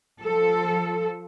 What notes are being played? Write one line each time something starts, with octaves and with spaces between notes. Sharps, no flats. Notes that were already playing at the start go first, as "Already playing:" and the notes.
F3 A4